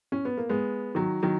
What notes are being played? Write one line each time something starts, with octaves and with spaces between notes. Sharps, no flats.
C#4
B3
A#3
G#3 B3
D#3 F#3
D#3 F#3